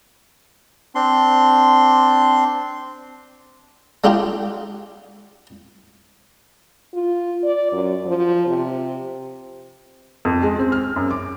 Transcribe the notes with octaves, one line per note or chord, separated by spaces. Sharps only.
C4 D4 C6
G#3 D4 D#4 F4 G4
F4
D5
F#2
F3
C3
F2
G#3
C4
F6
F#2
D6